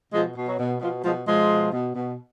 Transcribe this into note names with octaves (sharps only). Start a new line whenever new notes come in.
B2 F3 G#3
B2
F#3
B2
B2 F3
B2 F3 G#3
B2 F3 G#3
B2
B2
B2